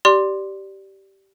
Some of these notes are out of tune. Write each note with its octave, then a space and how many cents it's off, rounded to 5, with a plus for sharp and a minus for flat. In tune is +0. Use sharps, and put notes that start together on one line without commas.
G4 -15 D5 +0 C6 +0